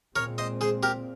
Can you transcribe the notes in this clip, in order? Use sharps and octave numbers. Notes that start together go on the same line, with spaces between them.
A#2 G#3 C4 A#4 C#5
C5 D#5
G#4 C5
G4 A#4